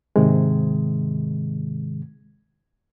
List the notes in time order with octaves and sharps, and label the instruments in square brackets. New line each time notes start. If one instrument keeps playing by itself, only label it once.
[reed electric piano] G#2 C3 D#3 G#3